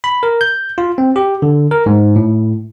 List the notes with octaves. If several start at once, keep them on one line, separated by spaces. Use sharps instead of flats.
B5
A#4
G6
F4
C4
G4
D3
A#4
G#2
A2